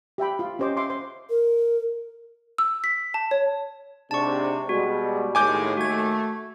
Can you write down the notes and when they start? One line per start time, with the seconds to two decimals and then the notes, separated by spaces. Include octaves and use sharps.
0.18 G4 E5 G5 B5
0.39 F4
0.59 C#4 G4 C5 D#5 D6
0.77 E5 C6 D6
0.90 C5 C6
1.30 A#4
2.58 E6
2.84 B6
3.14 A5
3.31 C#5
4.11 G#2 C3 D4 A5 C#6
4.69 B2 G3 G#3 F#4
5.35 D#2 A2 G#3 G#5 D6 G6
5.77 A3 F#4 G#6